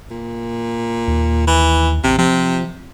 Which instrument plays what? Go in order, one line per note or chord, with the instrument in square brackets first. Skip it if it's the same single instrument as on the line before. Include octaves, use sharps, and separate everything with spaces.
[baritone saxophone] A#2
[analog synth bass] D#2
[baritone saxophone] E3
[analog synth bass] A1 [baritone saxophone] C3
[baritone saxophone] C3 [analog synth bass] F3